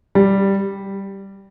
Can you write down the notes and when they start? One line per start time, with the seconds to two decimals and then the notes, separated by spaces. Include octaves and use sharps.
0.15 G3